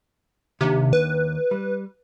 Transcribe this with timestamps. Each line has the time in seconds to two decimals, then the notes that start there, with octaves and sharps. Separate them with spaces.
0.61 D#2 C3 D#3 D4
0.93 B4
1.51 G3